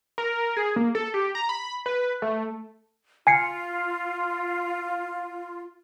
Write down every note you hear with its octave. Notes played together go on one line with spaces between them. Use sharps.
A#4
G#4
A#3
A4
G4
A#5
B5
B4
A3
F4 G#5 C7 C#7